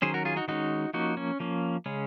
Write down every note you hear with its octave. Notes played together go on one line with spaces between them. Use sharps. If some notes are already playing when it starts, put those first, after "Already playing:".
D#3 F#3 C#4 G#4 C5
F#4 A#4
F4 G#4
D#4 F#4
D#3 G#3 C#4 D#4 F#4
F3 A#3 C#4 D#4 F#4
C#4
F3 A#3 C#4
C#3 G#3 C#4